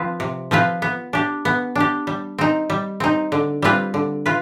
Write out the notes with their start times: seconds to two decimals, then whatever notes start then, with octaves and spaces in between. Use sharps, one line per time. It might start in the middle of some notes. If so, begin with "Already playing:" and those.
Already playing: F3 C4 F4 B4
0.20 C3
0.51 F3 C4 F4 B4
0.82 B3
1.13 D4 G4
1.45 B3
1.75 D4 G4
2.07 G3
2.38 C4 D#4
2.70 G3
3.00 C4 D#4
3.32 D3
3.62 G3 C4 F4 B4
3.94 D3
4.26 F4 B4